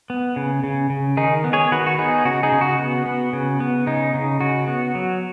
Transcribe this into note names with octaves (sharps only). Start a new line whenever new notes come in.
B3
C#3
C#3
C#3
D#3 D#4 G#4
B3
G#4 C#5
D#3 F#4 B4
F#4
B3 D#4 G#4
C#3 F#4
D#4 G#4
C#3
F#4
B3
B3
C#3
B3
C#3 D#4
C#3
C#3 F#4
B3
F#3